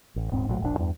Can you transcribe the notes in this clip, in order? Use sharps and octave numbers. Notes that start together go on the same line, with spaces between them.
A1
D#1 G#2 C4
A#1 A2 F#3
E1 A#1 A2 D4
E2 G2